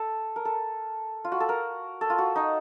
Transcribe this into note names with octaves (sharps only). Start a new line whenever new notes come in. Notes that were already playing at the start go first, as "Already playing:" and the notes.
Already playing: A4
A#4
A4
F4
F#4
A4
A#4
A4
F4
F#4
D#4